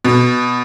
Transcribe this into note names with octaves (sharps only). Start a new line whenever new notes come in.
B2